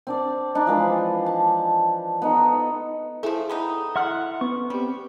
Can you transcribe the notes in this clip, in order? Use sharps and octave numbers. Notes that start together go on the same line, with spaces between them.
C4 D4 D5
D4 D#4
E3 F3 G#3 B4
A5
B3 D#4 A4
F3 A3 E4 G#4 A4
G3 B3 D#4
E5 F#5 C6 F6
B3 C#6
G3 C4 G4